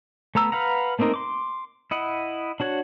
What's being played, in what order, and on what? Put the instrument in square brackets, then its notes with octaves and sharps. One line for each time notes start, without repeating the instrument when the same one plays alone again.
[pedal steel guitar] A3 B3 A#5 E6
B4 F5 F#5 A#5
A3 A#3 C4 D#4 A#4
C6 D6
E4 D#5 F#5
D4 F#4 C#5 F#5